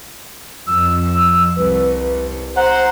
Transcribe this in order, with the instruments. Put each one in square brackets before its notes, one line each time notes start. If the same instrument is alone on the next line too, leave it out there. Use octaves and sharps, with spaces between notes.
[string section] F2 [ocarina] E6
[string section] C2 [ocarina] B4
[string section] C5 [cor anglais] F#5 [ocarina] A#5